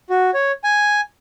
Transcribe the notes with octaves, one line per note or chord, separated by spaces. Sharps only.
F#4
C#5
G#5